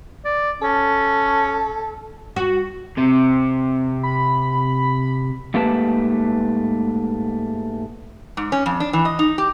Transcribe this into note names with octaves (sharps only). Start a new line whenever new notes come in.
D5
C#4 A4
F#4
C3
B5
G#2 A3 A#3 G4 B4 A5
G#2
C#4
F2
D4
E3
D#5
D#4
G4